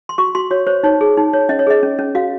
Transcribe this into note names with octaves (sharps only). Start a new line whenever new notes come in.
C6
F#4 C#6
F#4 C6
F#4 C#5
C5 C#5
D#4 C#5
G#4
D#4
C#5
C#4 D#5
C#5
G#4 D#5
C#4
C#4
F#4 F5